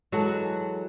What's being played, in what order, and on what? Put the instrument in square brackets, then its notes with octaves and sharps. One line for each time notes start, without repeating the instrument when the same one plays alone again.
[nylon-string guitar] E3 F#3 G#3 A4 F#5